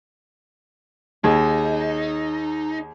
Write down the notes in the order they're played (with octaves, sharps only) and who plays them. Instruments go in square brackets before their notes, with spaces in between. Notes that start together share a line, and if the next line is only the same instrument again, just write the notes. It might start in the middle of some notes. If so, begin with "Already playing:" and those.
[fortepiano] D#2 [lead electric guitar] D#4 [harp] G#4